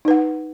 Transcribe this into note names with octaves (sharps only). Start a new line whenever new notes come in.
D#4 B4 F#5